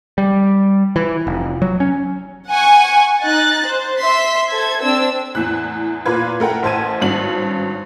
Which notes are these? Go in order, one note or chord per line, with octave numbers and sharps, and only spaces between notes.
G3
E3
F1
F#3
C#4
F#5 G#5 C#6
D#4 F#6 A6
C5
E5 C6 B6
A4 C5 G#6
C4 D4 E6
E2 A2 F#6
A#2 A#3 F4 B4 G#6
A3 A#4 F#5 G5
A1 C5 A5 G#6 D#7
G#1 G2 C#4 F#7